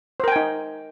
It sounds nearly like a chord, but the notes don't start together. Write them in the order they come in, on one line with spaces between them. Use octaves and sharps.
C5 A#4 G5 G#5 D#4